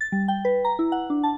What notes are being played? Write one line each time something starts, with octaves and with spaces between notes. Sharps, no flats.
A6
G3
G5
B4
A#5
E4
F#5
D4
A5